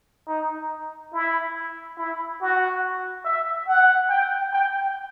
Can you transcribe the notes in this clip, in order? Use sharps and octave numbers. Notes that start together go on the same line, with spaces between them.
D#4
E4
E4
F#4
E5
F#5
G5
G5